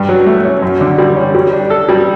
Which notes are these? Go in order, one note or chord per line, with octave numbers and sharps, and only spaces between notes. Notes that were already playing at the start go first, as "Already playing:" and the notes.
Already playing: G2
F#3
A3
C#4
F#2
D3
G3
C#4
G3
D4
A4
G3